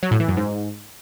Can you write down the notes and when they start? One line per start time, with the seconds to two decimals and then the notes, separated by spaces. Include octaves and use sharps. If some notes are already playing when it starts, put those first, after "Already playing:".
0.03 F#3
0.11 A2
0.20 E3
0.28 F#2
0.37 G#2